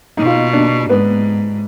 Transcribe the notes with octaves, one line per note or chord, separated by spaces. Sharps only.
B2 D#4
F4
D#4
D4
G#2 B3